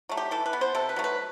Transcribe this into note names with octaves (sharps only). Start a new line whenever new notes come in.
F#3 A3
G4
E3 A4
B4
B3
C5
C3 A4
B4
F#3 A3
B4